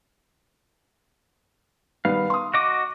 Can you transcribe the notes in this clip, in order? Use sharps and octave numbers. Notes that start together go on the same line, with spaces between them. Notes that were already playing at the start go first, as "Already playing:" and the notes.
D#3 G3 B3 F5
C6 D#6
F#4 D#5 D6